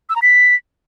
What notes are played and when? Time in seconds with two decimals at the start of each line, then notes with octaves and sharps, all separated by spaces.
0.09 E6
0.16 A#5
0.22 B6